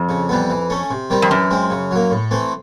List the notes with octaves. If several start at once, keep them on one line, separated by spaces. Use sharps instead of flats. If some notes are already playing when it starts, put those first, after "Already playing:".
Already playing: F2
C#3
E3 G3 B3
E3
A3 C#4
C3
D#3 G3 C4
F2
F#2 E3
G#3 C4
C#3
F#3 A#3
A2
E3 A3 C4